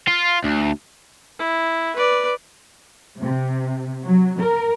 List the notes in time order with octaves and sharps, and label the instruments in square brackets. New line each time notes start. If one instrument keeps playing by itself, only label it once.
[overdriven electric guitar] F4
D2
[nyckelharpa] E4
B4 D5
[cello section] C3
F#3
A#4